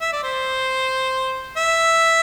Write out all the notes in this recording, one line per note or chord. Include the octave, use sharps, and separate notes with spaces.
E5
D5
C5
E5